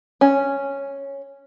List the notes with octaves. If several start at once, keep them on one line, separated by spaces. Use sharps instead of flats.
C#4